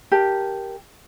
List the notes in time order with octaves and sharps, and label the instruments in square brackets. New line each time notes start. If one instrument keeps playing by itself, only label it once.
[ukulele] G4 A#4 A5